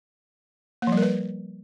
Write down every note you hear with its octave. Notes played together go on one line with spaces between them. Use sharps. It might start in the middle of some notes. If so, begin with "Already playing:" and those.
A#3
F3
G3
A#4
B4